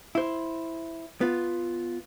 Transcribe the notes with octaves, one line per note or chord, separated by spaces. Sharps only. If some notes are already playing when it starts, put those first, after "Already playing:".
E4 C5
B3 F4